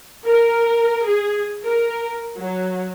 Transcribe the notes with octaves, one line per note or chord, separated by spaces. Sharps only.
A#4
G#4
A#4
F#3